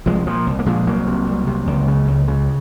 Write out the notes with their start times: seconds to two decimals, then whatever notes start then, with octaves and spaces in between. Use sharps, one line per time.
0.06 C2 F3 G#3
0.26 A#2 F3
0.47 C2
0.59 A#3
0.66 A#2 F3 G#3
0.87 C2 F#3 A#3
1.07 C3
1.27 C2
1.47 C3
1.67 C#2
1.88 C#3
2.07 C#2
2.28 C#3